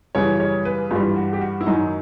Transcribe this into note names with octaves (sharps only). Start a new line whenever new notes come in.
F#2 C#3 E3 G3 C#5
C#5
B4
G2 E3 G3 F4
F#4
G4
F#4
E4
F#2 D#3 F#3 D#4